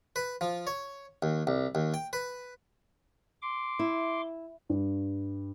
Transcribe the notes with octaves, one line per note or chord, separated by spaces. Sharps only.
B4
F3
C#5
D#2
C2
D#2
G5
B4
C6 D6
E4
G2